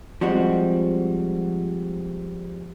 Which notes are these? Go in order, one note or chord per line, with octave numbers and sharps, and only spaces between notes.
F3 G3 G#3 C4 F#4